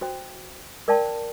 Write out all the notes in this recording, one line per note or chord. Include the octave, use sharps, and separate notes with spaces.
F#4 C5 G5
A#4 D5 F5 G5 A5